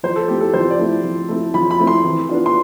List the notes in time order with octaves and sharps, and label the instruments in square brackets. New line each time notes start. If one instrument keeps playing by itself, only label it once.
[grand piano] F3 C5
A4
A3 C4 E4 G4
A4
F3 C5
D5
A3 C4 E4
F3
A3 C4 E4
F3 B5
B5
A3 C4 E4
C6
E3
B3 D4 F4
C6